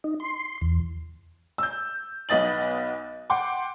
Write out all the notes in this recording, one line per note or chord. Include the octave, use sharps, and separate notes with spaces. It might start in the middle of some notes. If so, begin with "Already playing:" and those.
D#4
C6
E2
E6 G6
B1 B3 D#5 A6 F#7
F#5 G5 C6 D6